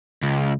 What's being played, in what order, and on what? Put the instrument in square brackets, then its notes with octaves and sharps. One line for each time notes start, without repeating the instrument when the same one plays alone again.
[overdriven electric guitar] C#2